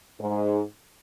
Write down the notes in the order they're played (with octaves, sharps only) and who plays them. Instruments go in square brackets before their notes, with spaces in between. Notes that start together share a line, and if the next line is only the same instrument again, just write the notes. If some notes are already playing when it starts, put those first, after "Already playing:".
[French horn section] G#2